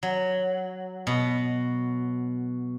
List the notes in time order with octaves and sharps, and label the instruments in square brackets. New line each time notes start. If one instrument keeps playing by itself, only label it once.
[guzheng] F#3
B2